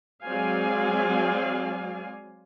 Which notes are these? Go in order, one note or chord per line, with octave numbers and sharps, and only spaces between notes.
F#3 G#3 C4 D5 F5 G#5